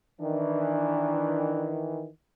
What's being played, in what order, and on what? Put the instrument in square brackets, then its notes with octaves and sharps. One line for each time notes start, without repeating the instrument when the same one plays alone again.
[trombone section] D#3 E3 [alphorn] D4